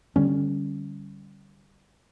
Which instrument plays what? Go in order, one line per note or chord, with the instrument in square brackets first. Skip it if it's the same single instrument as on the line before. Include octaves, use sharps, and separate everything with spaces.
[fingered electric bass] D3 G3 C#4